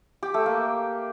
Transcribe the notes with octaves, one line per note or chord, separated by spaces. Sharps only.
G4
A3
A#3